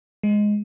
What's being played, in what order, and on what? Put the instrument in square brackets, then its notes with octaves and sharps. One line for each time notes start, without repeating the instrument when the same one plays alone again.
[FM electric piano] G#3